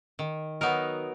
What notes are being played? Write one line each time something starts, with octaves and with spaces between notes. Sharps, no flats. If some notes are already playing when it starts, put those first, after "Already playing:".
D#3
F#3 B3 D#4 A#4